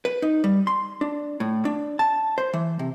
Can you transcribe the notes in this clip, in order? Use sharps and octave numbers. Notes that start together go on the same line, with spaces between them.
B4
D#4
G3
C6
D4
A2
D4
A5
C5
E3
C3